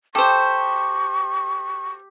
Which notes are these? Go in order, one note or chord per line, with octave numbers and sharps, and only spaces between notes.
G4 A4 C5 C#6